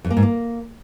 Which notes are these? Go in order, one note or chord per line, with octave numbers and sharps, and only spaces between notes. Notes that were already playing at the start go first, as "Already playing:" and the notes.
F2
A#3
G#2
A#3